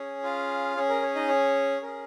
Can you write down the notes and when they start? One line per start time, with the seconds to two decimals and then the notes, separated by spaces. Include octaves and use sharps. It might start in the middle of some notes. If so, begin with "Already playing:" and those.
Already playing: C#4 G#4 C#5
0.24 F4 F5
0.76 C#4 G#4 C#5
0.90 A#4
1.02 C#5
1.15 D#4 D#5
1.29 C#5
1.82 C#4 G#4 A#4